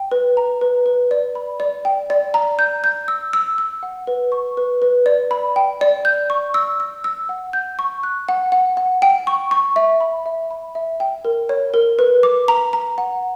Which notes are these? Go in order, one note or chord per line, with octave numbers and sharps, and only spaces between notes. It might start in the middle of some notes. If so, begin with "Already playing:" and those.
Already playing: G5
B4
A#5
B4
B4
D5
B5
D5
G5
D5
A#5
G6
G6
E6
E6
E6
F#5
B4
C#6
B4
B4
D5
B5
G5
D5
G6
C#6
E6
E6
E6
F#5
G6
C#6
F#6
F#5
F#5
F#5
G5
C#6
C#6
E5
B5
E5
B5
E5
G5
A#4
C#5
A#4
B4
D6
A#5
A#5
F#5